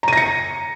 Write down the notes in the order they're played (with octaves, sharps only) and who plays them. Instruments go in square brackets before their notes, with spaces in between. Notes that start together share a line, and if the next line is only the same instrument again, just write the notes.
[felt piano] A#5
D#7
A#6
C#7